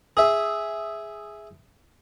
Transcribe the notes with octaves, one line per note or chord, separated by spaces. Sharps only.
G#4 E5